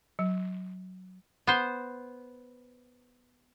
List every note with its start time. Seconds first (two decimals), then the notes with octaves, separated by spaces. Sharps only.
0.19 F#3
1.47 B3 C5